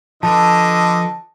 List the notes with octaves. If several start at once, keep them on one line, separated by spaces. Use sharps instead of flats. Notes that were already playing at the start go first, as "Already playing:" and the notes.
D3 F3 A4 B4 D#5 A5